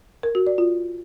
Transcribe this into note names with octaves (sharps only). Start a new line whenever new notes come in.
A#4
F#4
D5
F4